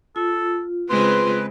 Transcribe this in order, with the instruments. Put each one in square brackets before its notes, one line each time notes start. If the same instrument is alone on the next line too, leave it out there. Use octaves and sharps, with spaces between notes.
[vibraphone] F4 [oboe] A4
[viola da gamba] C#3 G#3 C4 [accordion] B4 [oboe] C6